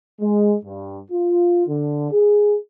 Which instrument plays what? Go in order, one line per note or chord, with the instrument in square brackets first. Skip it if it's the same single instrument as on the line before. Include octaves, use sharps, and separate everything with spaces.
[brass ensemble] G#3
G2
F4
D3
G#4